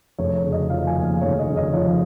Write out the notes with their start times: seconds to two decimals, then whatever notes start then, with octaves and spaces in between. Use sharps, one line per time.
0.18 F1 C#5
0.35 C#5
0.44 C#3
0.52 D#5
0.70 F3 F5
0.87 G#5
0.96 D#2
1.04 F5
1.21 F1 C#5
1.39 D#5
1.48 C#3
1.56 D#5
1.73 F3 C#5